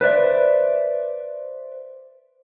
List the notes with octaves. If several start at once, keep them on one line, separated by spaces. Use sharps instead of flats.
B4 C5 D5 E5